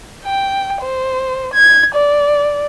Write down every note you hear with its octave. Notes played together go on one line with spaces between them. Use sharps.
G5
C5
G#6
D5